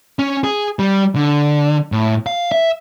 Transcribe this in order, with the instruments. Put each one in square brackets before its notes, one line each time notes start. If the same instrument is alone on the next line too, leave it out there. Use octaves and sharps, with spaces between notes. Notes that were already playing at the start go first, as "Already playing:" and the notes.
[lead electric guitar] C#4
G#4
G3
D3
A2
F5
E5